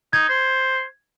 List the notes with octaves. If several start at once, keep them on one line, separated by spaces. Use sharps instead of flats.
D#4 G#6
C5